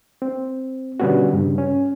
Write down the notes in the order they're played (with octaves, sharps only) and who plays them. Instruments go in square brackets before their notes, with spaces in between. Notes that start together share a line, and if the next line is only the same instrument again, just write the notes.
[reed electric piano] C4
B2 D3 G3 B3 C#4 F#4
G2 C#3
C#4